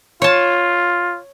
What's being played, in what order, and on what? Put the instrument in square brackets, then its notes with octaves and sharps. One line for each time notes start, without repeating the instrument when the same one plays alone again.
[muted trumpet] F4 [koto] C#5 A5